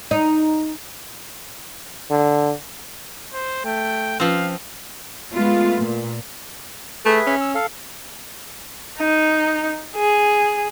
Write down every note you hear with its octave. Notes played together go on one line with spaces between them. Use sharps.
D#4
D3
C5
A3 G5
F3 C4 C#4 F4 B4 F5
G#3 A3 B3 F4
A#2
A3 G#4 B4 E5
C#4
E6
A4 F5
D#4
G#4